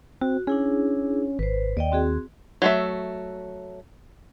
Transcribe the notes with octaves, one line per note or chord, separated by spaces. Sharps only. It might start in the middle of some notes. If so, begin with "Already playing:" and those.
C4 F#4
C#4 D4 E4 G#4
G#1 B4 C5
D#2 D5 D#5 G5
C4 F#4 G#4
F#3 A3 E5